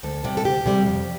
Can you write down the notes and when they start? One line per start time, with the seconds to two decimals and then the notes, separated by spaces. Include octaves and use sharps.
0.03 D2 A4
0.24 C3 G3
0.37 A4
0.45 D2 G4
0.66 C3 G3
0.86 F2